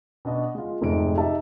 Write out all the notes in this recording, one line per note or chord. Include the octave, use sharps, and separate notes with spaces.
B2 D4 D#5
G#3 F4
F1 F2 G#2 C3 G#3 D7
D#4 G4 E5 A5